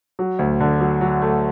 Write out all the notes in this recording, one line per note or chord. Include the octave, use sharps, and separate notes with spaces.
F#3
D2
D3
F#3
F#3
A3